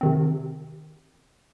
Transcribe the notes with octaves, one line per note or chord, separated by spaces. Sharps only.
C3 D#3 C4